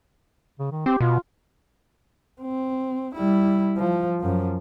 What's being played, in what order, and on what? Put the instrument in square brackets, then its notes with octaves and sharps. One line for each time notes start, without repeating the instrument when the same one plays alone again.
[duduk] C#3
D#3
[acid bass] C4 [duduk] G4
[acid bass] B2 [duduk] F4
[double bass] C4
G3 E4
F3
F#2 F3